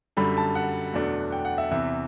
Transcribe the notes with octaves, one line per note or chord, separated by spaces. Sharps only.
F#2 D3 G3 B5
A5
F#5
E2 B2 F#3 A3 D4
G5
F#5
E5
E2 C3 E3 E5